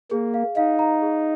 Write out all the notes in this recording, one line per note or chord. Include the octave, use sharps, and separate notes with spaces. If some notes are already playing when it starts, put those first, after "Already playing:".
A#3 G#4
F5
D#4 F5
A#5
G#4